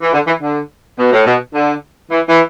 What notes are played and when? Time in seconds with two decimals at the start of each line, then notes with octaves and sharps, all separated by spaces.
0.01 E3
0.13 D3
0.26 E3
0.41 D3
0.97 B2
1.11 A2
1.25 B2
1.54 D3
2.10 E3
2.27 E3